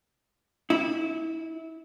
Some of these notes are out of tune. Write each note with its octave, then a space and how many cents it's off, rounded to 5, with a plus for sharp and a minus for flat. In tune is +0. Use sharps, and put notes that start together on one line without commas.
E4 -25